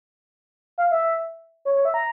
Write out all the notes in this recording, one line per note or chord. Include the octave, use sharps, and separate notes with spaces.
F5
E5
C#5
C#5
E5
A#5